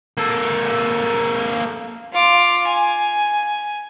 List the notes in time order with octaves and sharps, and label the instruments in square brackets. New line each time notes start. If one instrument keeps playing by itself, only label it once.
[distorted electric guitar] A#3 A4
[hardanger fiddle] F4 D6
G#5